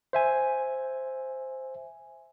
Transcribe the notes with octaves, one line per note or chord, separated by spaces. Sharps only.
C5 E5 G#5